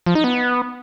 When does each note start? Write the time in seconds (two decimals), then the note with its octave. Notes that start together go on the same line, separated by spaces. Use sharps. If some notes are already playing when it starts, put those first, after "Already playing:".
0.06 F3
0.15 D#4
0.24 B3